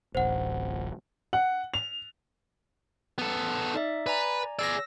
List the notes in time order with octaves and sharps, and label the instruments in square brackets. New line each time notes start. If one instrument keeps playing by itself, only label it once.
[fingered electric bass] D1 A1 [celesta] C5 F#5
[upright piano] F#5
F7
[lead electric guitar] B3 A4
[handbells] D#4 D5 E5
[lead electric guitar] B4 [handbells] D5 G#5 A#5
[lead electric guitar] G#4 D5 [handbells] E6 A#6